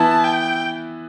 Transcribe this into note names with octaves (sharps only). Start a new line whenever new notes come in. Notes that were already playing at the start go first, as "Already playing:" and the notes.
Already playing: E3 B3 E4 A5
G5